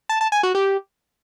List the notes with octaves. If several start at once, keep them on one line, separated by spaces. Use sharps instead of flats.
A5
A5
G#5
F#4
G4